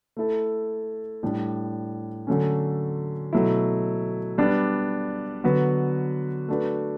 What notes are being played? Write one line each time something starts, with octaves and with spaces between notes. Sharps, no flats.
A3 E4 A4
A2 G3 D4
D3 F#3 A3 C#4
B2 F#3 A3 E4
G3 B3 D4
D3 F#3 B3 F#4 B4
A3 D4 F#4 B4